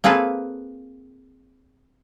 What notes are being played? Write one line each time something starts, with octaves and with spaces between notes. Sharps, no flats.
A#3 C4 F4 G#4 A4 B4